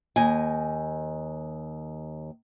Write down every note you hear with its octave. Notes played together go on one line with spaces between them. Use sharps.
D#2 D#5 G#5